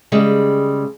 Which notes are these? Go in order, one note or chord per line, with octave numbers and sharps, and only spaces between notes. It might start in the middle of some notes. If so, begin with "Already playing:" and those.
C#3 G3 G#3